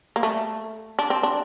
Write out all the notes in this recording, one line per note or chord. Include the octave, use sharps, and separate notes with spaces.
A#3
A3
D4
C4
D4